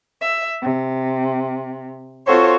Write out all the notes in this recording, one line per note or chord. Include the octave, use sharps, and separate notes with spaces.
E5
C3
C4 F4 F#4 A4 C5 C#5